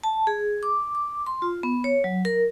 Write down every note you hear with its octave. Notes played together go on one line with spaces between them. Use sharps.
A5
G#4
D6
D6
C6
F4
B3
C#5
F#3
A#4